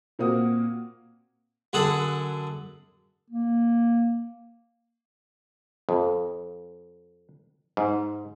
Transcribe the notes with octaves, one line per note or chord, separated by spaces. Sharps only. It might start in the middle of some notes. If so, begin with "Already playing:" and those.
A#2 A#3 C4 F#4 D#6
F#2 D3 G#4 A4 F#5 A5
A#3
F2
G#2